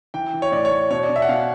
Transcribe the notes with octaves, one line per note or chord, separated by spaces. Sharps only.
E3 G5
E3
C#5
A2 D5
C#5
A2
B2 C#5
D5
B2
E5
F#5
B2 F5